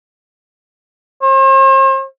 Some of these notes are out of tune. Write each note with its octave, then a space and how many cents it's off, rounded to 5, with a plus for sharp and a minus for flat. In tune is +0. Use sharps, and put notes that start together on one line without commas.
C5 +45